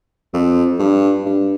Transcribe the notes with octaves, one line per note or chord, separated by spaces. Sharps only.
F2
G2
G2